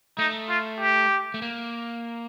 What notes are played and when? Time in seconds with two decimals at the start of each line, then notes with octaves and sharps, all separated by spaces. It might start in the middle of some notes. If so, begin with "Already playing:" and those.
0.18 A3 D#4
0.49 F4
0.80 G4
1.34 A3
1.42 A#3